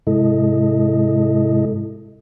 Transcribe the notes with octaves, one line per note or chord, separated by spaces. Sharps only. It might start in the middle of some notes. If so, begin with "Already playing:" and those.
G#2 C3 G#3 E4 A4 D#5